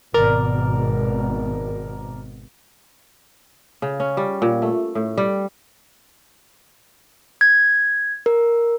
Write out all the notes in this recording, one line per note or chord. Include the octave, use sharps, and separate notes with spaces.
G#1 B2 A#4 D5
C#3
C#4
G3
A#2
A3
A2
G3
G#6
A#4